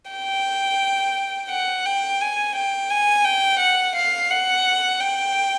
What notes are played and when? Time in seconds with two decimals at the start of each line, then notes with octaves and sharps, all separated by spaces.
0.11 G5
1.50 F#5
1.86 G5
2.21 G#5
2.55 G5
2.90 G#5
3.24 G5
3.60 F#5
3.95 F5
4.30 F#5
5.00 G5